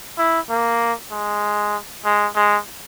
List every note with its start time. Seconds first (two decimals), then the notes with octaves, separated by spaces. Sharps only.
0.18 E4
0.50 A#3
1.11 G#3
2.05 G#3
2.35 G#3